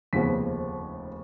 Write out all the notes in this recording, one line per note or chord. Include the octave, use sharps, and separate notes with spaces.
F1 D#2 C#3 F3 B3 B6